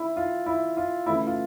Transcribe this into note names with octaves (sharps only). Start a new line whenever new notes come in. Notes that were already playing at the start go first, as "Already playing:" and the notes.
Already playing: E4
F4
E4
F4
C#3 E3 A3 E4
F4